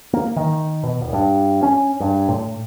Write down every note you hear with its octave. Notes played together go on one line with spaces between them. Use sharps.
A#3
D#3
B2
D#1
G2
C#4
G2
A2